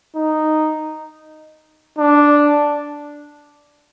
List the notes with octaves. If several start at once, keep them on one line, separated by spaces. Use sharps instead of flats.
D#4
D4